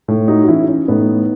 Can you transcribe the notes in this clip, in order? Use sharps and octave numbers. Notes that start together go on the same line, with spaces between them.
A2
D#4 F#4
F#4
E3 C#4 E4
C#4
A2 B3 D#4